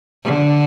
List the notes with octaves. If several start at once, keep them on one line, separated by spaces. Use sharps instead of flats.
D3